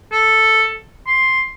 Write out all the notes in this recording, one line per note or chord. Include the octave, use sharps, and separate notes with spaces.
A4
C6